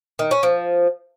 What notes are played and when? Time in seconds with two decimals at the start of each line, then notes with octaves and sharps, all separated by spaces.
0.19 D#3
0.31 C#4
0.43 F3